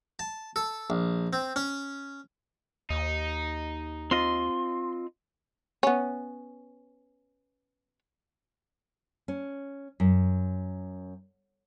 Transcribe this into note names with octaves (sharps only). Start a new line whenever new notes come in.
A5
A4
A#1
C4
C#4
D#2 D#4
C4 F4 D#5 C6
B3 C#4
C#4
F#2